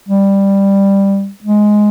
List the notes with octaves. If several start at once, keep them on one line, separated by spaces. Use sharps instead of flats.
G3
G#3